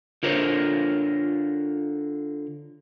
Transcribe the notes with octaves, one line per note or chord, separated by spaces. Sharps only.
D3 F4 A#4 C5 C#5